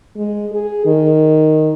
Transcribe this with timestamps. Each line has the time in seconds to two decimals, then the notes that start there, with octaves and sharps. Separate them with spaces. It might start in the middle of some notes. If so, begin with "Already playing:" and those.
0.17 G#3
0.52 G#4
0.86 D#3